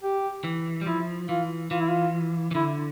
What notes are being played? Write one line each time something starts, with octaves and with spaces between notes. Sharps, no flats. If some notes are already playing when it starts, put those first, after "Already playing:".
G4
E3
G3
F3 E4
E3 F4
E3 F4
E4
F4
E3
D3 E4